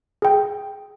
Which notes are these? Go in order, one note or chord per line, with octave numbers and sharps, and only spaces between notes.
G#4 G5